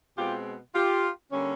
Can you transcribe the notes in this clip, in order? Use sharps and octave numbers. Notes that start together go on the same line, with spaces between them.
B2 G#3 C4 F4 G4
F4 G4
D3 G3 A#3 C#4